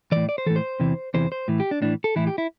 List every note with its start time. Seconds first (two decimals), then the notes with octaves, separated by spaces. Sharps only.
0.12 A2 E3 D5
0.29 D5
0.38 C5
0.46 A2 E3 A4
0.56 C5
0.80 E2 C3 E3
1.14 E2 C3 E3 C5
1.32 C5
1.48 A2 E3
1.60 G4
1.71 D4
1.82 A2 E3 D4
2.04 A4
2.16 A2 E3 E4
2.27 G4
2.38 E4